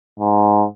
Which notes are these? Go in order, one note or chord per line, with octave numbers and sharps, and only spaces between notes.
G#2